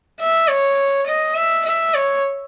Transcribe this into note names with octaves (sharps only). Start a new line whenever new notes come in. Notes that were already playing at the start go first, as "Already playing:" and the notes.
E5
C#5
D#5
E5
E5
C#5